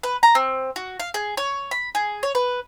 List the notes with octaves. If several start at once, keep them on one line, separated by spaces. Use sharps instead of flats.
B4
A#5
C4
F#4
F5
G#4
C#5
B5
G#4
C#5
B4